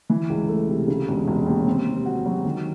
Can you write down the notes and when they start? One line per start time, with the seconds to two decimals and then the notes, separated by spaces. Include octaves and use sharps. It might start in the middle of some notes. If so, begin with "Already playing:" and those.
0.10 E3
0.30 C#2
0.48 A3
0.69 C3
0.88 C#3
1.08 E1
1.28 E1
1.46 D#2
1.67 C4
1.87 C3
2.06 F#4
2.26 F#3
2.45 D#3